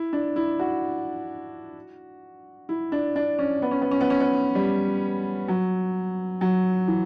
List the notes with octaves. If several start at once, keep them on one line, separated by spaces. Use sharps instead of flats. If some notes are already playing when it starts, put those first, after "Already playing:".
Already playing: E4
D4
E4
F#4
E4
D4
D4
C#4
B3
C#4
B3
C#4
B3
C#4
B3
G3
F#3
F#3
E3